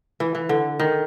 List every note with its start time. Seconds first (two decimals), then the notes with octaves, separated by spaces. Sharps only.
0.20 E3
0.35 E3
0.49 D3
0.80 D#3